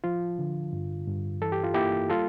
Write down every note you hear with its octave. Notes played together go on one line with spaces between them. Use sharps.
F3 F4
D3
G2
G2
E3 A4
G4
F4
A#3 E4 G4
G3 F4 A4